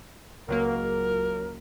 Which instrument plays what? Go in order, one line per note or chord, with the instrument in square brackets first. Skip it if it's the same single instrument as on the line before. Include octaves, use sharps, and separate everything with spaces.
[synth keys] C#2 F#3 A#3 [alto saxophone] A#4